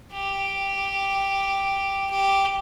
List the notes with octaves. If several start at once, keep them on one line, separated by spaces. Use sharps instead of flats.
G4
G4